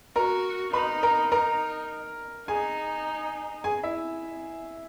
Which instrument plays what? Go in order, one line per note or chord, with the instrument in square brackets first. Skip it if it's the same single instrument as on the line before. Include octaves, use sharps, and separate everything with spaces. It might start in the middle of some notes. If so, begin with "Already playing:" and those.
[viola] F#4 [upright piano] A#4 A#5
[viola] D#4 [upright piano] B4 B5
[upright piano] A#4 A#5
[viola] D#4 [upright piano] A#4 A#5
[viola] D#4 [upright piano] G#4 G#5
[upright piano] G#4 G#5
E4 E5